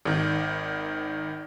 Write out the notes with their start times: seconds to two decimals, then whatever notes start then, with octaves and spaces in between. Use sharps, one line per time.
0.05 G#1 D#3